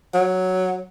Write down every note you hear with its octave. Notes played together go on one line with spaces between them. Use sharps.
F#3